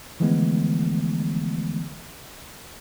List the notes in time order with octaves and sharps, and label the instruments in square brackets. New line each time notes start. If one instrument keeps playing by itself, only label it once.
[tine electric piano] D3 E3 F3 G#3 A3 B3